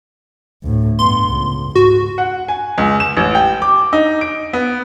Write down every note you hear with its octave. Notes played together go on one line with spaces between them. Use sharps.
D2 A2
G2 B3 C6
C#2
G#2 F#4
F#5
G#5
C#2
E7
A1
G5
D6
D#4
D7
B3